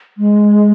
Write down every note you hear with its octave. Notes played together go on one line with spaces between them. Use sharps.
G#3